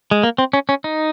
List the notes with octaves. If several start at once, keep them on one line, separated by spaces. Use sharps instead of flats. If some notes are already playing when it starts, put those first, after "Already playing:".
G#3
A#3
C4
C#4
C#4
D#4